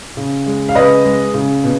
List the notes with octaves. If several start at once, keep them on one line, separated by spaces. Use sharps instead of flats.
C#3
G#3
F5
C#3 B4 D#5
G#3
C#3
B2